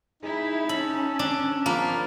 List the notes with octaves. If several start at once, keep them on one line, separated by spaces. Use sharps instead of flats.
D#4 E4 G#4
C#4 A5 B5 E6
D4
F3 A#3 C4 B5